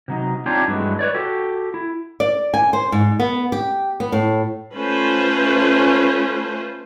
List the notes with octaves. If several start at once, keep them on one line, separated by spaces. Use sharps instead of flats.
C3 F#3 D#4
C4 D4 D#4 F4 G4 C#5
G2 E3 F#3 G#3 A3
B4 C#5 D5
F#4 G4 A4
E4
D5
G#5
C5
G#2
B3
G4
B3
A2
A3 C#4 F4 B4 C5